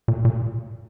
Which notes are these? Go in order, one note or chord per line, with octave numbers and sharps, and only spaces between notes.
A#2
A#2